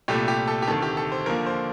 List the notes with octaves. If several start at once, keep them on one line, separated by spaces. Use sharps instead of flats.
C2 A#2 A3 G4
G4
A4
G4
D2 C3 D#3 A4
G4
A4
C5
D#2 D3 F3 A#3 A#4
C5